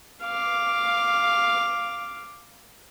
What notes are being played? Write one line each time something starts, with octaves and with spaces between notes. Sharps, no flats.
F5 D6